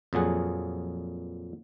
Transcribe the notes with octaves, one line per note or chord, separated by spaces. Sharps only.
F2 A#2 F#3 G#4 F#5